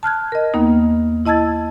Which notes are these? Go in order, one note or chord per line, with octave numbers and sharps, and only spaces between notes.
A5 F6 F#6 G#6
A#4 D#5
D#2 A#3 B3 D#4
E4 D#5 A5 E6 G#6 A6